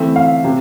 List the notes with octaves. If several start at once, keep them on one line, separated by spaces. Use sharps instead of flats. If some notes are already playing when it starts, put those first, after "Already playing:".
Already playing: E3 A3 C4 E5
F5
C3